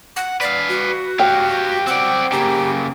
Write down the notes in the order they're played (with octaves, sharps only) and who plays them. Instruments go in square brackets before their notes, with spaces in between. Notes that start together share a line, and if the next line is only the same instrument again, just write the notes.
[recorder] F#5
[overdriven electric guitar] B4 F5 [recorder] D5
[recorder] F#4
[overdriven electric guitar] G4 F5 [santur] G5
[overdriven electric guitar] C4 D5 [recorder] F#5
[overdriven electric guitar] C#3 A#3 [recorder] G4